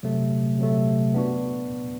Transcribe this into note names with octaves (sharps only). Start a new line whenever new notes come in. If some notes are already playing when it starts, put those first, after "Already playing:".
C3 F#3 A3
C3 F#3 A3
B3 D4 F#4